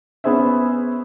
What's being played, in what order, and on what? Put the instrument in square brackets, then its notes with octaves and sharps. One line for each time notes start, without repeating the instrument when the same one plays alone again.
[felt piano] B3 C#4 G#4 C5 E5